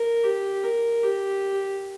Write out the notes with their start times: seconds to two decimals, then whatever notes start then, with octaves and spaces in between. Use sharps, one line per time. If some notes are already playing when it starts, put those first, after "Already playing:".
Already playing: A#4
0.24 G4
0.64 A#4
1.03 G4